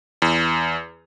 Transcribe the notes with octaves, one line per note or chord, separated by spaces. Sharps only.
E2